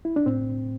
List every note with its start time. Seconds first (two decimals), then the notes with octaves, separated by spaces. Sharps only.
0.05 E4
0.16 D4
0.26 A2 C4